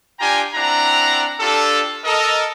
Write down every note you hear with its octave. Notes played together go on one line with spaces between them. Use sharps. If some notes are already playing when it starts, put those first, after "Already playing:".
D4 F4 G4 G5 G#5 A#5
C4 D4 E4 F#5 A#5
D4 F4 G4 A4
A4 A#4 D#5